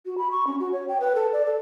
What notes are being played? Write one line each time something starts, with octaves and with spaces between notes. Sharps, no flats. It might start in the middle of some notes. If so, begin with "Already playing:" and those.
F#4
B5
C#6
C#4
F#4
C#5
G5
B4
A4
D5
A4